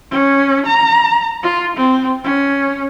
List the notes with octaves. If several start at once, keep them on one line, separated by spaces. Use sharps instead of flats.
C#4
A#5
F4
C4
C#4